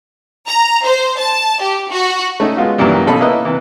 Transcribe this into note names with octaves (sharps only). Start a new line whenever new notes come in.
A#5
C5
A5
G4
F#4
A3 C#4 D#4
G#3 B3 F4 F#4
F#2 A#2 D#3 E3 G3
A#1 B2 C#4 A4 B5
A#3 E4 A#4 B4 D#5
C3 E3